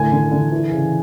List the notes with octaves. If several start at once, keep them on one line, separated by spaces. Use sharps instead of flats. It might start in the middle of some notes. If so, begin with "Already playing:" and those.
Already playing: A2 D3 G#5
D3
D3
E3
C#3